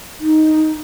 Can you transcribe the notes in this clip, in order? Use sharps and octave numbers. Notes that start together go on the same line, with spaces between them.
D#4